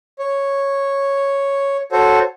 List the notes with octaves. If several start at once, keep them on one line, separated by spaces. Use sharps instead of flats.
C#5
F#4 A4 C5 C#5